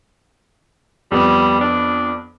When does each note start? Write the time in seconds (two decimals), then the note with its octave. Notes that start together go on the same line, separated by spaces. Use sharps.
1.12 F2 G3 B3
1.61 D4